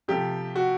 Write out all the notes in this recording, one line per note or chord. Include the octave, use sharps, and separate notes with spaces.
C3 F3 A3 G4
F#4